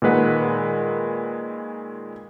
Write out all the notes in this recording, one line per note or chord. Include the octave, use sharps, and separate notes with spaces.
A#2 D#3 G#3 B4 F#5